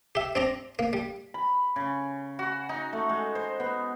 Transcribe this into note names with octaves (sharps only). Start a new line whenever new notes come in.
G4 E5
C4 D5 A#5
A#3
G3
B5
C#3
F#4
D#4
A3
G#3
C5
B3